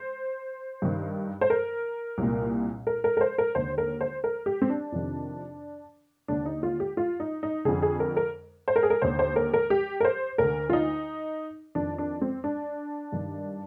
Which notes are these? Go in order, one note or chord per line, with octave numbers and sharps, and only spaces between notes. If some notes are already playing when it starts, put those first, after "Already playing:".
Already playing: C5
G2 D#3
C5
A#4
C2 A#2
A#4
A#4
A#4
C5
A#4
D#2 D3 C5
A#4
C5
A#4
G4
C4
D4
F2 C3 D#3
D#2 D3 D4
D#4
F4
G4
F4
D#4
D#4
F2 D3 G#4
G#4
A#4
A#4
C5
A#4
G#4
A#4
D#2 D3 C5
C5
A#4
A#4
G4
A#4
C5
D2 D3 A#4
F4
D#4
F2 D#3 D4
D4
C4
D4
G2 D#3